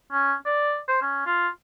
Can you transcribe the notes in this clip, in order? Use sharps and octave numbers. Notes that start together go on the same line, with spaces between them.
C#4
D5
C5
C#4
F4